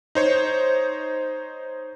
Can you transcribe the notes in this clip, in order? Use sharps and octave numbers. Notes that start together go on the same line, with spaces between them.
D#4 C5 C#5